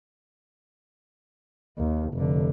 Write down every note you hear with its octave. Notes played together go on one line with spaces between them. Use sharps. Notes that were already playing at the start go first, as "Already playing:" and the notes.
D#2
F1 D3